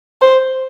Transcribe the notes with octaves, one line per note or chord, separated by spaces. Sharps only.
C5